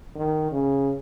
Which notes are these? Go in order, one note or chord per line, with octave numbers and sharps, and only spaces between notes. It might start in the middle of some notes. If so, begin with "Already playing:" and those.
D#3
C#3